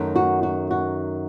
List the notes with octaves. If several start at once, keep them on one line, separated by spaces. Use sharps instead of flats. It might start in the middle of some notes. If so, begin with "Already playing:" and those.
Already playing: F#2 D#3 A3
F#4
F#4
F#4